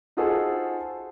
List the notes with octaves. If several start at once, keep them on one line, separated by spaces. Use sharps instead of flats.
D#4 F4 F#4 G#4 A4 C5